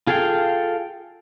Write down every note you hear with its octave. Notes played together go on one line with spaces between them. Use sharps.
F4 G#4 A4 F5 G5